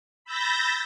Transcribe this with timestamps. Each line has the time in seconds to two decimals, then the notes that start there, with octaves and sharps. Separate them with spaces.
0.24 B5 E6 G6 A6 A#6